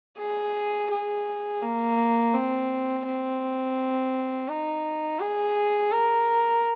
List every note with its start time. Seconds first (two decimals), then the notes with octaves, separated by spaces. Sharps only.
0.19 G#4
0.91 G#4
1.62 A#3
2.33 C4
3.06 C4
4.48 D#4
5.20 G#4
5.92 A#4